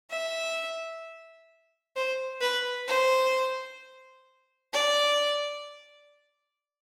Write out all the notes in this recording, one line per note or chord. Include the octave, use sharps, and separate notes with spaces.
E5
C5
B4
C5
D5